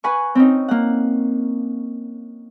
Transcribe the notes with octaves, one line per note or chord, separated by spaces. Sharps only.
B4 F#5 G#5 C#6
C4 C#4 D#4
A#3 F#5